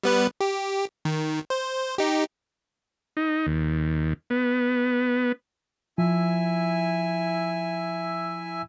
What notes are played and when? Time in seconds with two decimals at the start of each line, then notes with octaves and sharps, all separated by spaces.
0.03 G3 B3 B4
0.40 G4
1.05 D#3
1.50 C5
1.98 D#4 G4
3.17 D#4
3.47 D#2
4.30 B3
5.98 F3 E4 E5 G#5